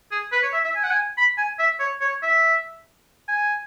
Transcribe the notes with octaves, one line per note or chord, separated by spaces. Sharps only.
G#4
B4
C#5
E5
E5
G#5
F#5
G#5
B5
G#5
E5
C#5
C#5
E5
G#5